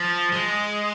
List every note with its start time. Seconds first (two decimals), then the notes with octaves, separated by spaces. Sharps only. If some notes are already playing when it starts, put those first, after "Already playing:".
Already playing: F3
0.33 G#3